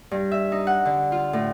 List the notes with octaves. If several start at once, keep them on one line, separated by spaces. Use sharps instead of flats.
G2
E5
D#4
F#5
D3
F4
A2